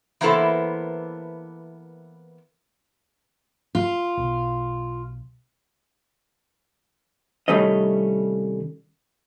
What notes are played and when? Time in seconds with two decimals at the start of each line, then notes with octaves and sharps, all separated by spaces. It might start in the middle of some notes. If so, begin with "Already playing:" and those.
0.21 E3 A#3 B3 E4 A4 C5
3.75 F4
4.17 B1
7.48 C2 D#3 G3 A3 C#4 D#5